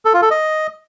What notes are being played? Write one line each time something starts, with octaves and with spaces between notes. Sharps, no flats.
A4
F4
A4
D#5